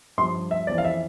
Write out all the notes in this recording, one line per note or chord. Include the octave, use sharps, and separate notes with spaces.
G2 F3 C6
E5
F2 E3 D5
F5
E5